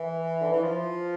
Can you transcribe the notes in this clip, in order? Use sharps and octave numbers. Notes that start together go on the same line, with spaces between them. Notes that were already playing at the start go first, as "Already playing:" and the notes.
Already playing: E3
D3
E3
F3